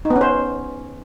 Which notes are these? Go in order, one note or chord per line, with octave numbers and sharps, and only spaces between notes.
D#4
B3
C#4
C5